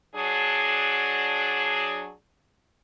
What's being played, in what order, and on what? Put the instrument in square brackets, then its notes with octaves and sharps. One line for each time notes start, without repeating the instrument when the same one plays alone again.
[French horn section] F#3 D4 G#4